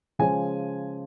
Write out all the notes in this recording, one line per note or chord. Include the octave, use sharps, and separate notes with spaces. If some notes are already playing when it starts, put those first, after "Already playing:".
C#3 F3 G#3 C#4 G#5